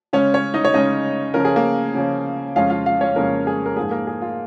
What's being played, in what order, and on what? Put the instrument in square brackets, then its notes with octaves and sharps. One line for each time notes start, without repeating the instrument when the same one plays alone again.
[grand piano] C#3 G#3 C#4 C#5
C#4 C#5
D#4 D#5
C#5
C#3 G#3 C#4 D#4 D#5
C#3 F3 C#4 A#4
G#4
A#3 A#4
C#3 F3 C#4
F2 C#3 F3 G#3 C#4 F4 F5
F4 F5
F4 F5
C#4 C#5
F2 C#3 F3 G#3 A#3 C#4 A#4
G#4
A#4
G#2 F3 A#3 G#4
A#3 A#4
G#4
F4